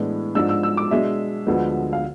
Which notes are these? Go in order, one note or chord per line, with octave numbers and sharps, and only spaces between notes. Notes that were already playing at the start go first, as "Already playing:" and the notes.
Already playing: A2 E3 G#3 B3 D4
G#2 F3 G#3 D4 E6
E6
E6
D6
B2 G#3 D4 E5
D2 D3 F3 G#3 B3
F5